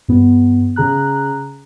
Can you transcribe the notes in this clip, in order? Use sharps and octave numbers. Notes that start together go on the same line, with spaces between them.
G2 B3
C#3 G#4 A#5 F#6